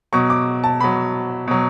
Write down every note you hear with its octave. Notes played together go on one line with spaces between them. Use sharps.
B2 F#3 C#6
D6
A5
B2 F#3 B5
B2 F#3